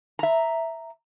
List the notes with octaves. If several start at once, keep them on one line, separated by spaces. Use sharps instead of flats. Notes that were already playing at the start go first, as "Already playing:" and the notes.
E5 A#5